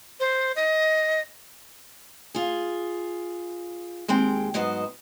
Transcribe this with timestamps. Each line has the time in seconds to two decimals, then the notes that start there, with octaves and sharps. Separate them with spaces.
0.20 C5
0.56 D#5
2.35 F4 G#4
4.08 D#2 G#3 C4 G5
4.54 G#2 F#3 B3 C5 D#5